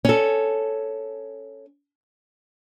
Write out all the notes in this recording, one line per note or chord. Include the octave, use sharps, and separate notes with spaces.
C#4 A4